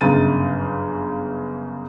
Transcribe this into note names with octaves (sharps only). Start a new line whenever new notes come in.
G1 F#2 C#3 A6 D#7